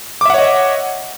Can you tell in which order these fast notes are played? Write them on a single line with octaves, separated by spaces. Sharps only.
D6 E5 F#5 C#5 D#5